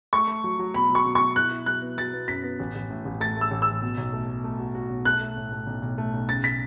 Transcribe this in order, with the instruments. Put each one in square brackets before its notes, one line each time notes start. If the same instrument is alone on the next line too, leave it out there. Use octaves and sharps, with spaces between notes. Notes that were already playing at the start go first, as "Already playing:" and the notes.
[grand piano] A3 [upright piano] C#6
[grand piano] A3
F#3
F#3
[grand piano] B2 [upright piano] B5
[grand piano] F#3
[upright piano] C#6
[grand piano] B2
[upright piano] C#6
[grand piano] B2
[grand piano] E4 [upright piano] F#6
[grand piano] E4
[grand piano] F#3 [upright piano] F#6
[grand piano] B3
[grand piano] F#3 [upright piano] A6
[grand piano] B3
[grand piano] F#2 [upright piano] B6
[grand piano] B3
A1
A1
A2
A1
[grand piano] A3 [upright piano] A6
[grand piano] A3 [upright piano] E6
[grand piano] A1
[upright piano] E6
[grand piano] A1
B2
B1
A3
A3
A3
F#4
F#4
B1
[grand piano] A3 [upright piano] F#6
[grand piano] A3
A2
A3
B1
B1
A3
B1
[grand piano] C#3 [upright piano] A6
[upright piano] B6